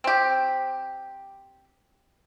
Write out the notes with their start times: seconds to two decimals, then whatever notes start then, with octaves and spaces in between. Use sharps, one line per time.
0.04 C4 G4